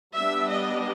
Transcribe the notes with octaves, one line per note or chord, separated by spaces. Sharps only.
G3 B3 D4 E5
D#5